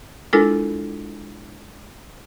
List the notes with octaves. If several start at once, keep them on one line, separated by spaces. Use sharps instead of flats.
G#3 D4 E4 F4 A4 A#4